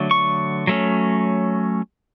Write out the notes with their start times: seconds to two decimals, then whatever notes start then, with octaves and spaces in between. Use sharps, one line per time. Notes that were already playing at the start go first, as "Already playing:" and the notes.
Already playing: D3 F#3 A3
0.11 C#6
0.67 F#3 A3 C#4